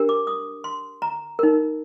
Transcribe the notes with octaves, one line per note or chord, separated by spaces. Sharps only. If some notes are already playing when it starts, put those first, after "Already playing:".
Already playing: D4 G4 A#4
D6
D#6
C6
A#5
D#4 A#4